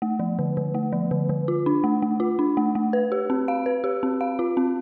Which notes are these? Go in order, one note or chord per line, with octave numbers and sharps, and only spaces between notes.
A3
F3
D3
D3
A3
F3
D3
D3
F4
D4
A3
A3
F4
D4
A3
A3
B4
G4
C4
F5
B4
G4
C4
F5
F4
C4